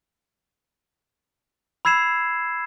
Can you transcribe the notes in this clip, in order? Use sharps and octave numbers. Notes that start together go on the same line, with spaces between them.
B5 E6 G#6 C7 E7